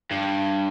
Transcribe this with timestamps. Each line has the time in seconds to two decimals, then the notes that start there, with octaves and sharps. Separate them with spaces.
0.11 G2